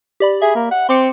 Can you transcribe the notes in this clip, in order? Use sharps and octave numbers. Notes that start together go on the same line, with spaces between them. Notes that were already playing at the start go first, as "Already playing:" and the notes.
G4 D5 B5
G#4 E5
A#3
F#5
C4 C6 D6 C#7